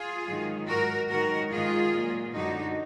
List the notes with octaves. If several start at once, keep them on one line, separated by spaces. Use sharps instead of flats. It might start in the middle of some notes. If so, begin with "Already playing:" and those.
Already playing: F4 G#4
G#2 D#3 F#3
G#2 F#3 F#4 A#4
G#2 D#3 F#3 F#4 A#4
G#2 D#3 G#3 F4 G#4
A#2 F#3
F#2 D3 G#3 D#4 F#4